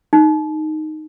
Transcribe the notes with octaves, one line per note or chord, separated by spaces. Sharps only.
D#4